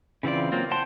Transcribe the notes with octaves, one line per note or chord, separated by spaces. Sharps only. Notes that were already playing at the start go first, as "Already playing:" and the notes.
C#3 E3 C4 F4 D5
F#3 A#3 C4 F4
C5 F#5 G5 A5 C6